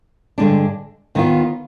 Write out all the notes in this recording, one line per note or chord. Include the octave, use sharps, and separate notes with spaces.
G2 D3 G#3 D4
D#2 D#3 B3 F4